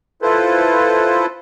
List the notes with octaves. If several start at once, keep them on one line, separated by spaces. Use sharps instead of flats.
E4 F4 A4 B4 C5